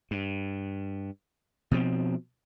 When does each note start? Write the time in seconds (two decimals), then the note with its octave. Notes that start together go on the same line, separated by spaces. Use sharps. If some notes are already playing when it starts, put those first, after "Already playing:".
0.11 G2
1.71 B2 F3 C4